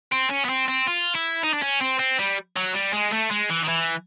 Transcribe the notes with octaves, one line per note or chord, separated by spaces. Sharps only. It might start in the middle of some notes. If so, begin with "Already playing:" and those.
C4
C#4
B3
C4
C4
F4
E4
D#4
D4
C#4
C4
C4
G3
F#3
G3
G#3
A3
G#3
E3
D#3
E3